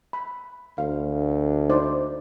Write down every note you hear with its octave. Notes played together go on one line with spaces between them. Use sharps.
B5
D2 F5
D#4 C5 D5